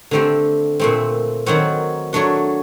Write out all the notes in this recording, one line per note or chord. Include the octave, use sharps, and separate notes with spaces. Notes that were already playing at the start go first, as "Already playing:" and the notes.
D3 A3 C4 G4
A#2 A3 C4
D#3 F#3 C4 F#4
F#3 A3 D4 F#4